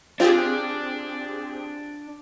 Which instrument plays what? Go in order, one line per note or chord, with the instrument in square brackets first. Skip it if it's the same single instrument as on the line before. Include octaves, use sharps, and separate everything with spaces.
[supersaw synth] C4 G4 G#4 [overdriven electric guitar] D4 [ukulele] F4